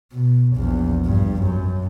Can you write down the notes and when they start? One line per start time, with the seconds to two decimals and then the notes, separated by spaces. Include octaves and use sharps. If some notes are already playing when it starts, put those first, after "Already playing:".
0.13 B2
0.56 A#1 E2
1.06 G2
1.43 F#2